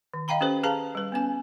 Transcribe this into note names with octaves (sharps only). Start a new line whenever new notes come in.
D#3
D#5 F5 G5 A#5 B5
C#4 G4 A4 B4 C5
G#4 B4 F5 A5 A#5
G3 B4
B3 C#4 G#5